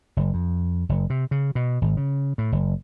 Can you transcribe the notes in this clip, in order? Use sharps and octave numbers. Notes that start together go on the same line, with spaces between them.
F#1
F2
F#1
C3
C#3
B2
G#1
C#3
A2
F#1